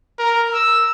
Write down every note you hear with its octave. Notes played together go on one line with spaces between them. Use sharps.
A#4
E6